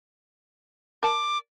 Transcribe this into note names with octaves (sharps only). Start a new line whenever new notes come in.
A#4 A5 D6